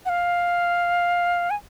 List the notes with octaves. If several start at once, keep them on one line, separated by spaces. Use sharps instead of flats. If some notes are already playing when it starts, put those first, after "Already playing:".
F#5
F5
G#5